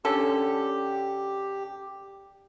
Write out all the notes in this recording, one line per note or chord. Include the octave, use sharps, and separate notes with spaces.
D3 C#4 G4 A4